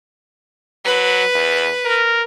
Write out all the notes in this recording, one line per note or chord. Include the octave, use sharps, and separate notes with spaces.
F#3 B4
E2
A#4